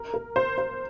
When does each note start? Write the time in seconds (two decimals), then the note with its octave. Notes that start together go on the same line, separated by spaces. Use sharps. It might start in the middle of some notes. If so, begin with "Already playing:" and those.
Already playing: A#4
0.14 A#4
0.36 C5
0.58 C5